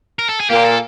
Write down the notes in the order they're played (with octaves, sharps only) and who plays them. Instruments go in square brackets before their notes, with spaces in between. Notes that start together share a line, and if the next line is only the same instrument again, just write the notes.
[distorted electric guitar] A#4
A4
G#4
[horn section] A#2 A#3 [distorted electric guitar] G4
[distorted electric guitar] A4